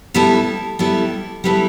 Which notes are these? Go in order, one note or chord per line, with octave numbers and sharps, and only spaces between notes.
G3 B3 E4 A4
G3 B3 E4 A4
G3 B3 E4 A4